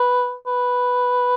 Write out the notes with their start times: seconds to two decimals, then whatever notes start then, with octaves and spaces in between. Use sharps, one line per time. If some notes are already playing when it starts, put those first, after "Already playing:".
Already playing: B4
0.47 B4